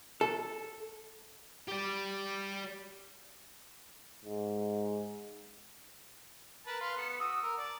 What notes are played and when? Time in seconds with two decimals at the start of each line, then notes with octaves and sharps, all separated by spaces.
0.21 A4
1.68 G4 D5
4.25 G#2
6.67 A#4 B4 A5
6.81 B4 F5 C6
6.97 B3 A4
7.20 F#4 D#6 E6
7.43 A#4
7.58 D5 A5